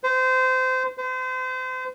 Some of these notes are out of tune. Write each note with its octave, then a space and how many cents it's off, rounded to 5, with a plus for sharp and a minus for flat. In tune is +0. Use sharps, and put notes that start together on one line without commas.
C5 -25
C5 -35